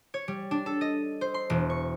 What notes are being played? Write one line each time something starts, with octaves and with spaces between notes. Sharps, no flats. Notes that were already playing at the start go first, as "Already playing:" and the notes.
C#5
G3
D4
A4
D#5
C5
C6
E1
C#6